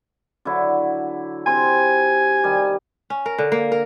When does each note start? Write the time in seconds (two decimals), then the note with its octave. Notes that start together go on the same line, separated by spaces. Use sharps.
0.45 D3 F#3 E4
1.47 C3 G#5 C6
2.44 D#3 G3
3.10 C#4
3.26 A#4
3.38 D3
3.52 A#3
3.72 A#4